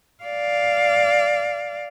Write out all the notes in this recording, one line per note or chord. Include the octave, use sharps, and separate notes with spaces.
D5 F5